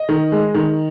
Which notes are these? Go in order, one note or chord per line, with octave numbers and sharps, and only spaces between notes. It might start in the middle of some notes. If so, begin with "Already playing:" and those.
Already playing: D#5
D#3
G#3
D#3